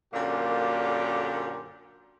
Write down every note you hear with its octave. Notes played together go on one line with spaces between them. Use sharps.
F#2 A#2 D3 A#3 G4 A4